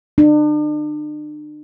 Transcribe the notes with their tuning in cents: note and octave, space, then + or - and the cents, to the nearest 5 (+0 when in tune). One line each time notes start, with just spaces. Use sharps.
D4 +40